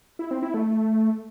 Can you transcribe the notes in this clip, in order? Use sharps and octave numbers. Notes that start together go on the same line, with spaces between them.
E4
C4
E4
A3